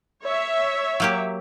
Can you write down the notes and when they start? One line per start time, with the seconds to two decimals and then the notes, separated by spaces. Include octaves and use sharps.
0.23 C#5 E5
1.00 F#3 A#3 G4